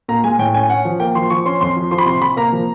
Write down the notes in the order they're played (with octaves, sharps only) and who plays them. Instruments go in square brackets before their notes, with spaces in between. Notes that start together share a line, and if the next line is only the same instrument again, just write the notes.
[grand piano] A#2 A#5
G#3 G#5
A2 G5
C#4 G#5
C#4 F#5
F3
A#3 G5
F3 C6
F3 C#6
C#4 C6
F2 C6
F3
F3 C6
B5
C3 C6
C3 B5
A#3 A#5
F3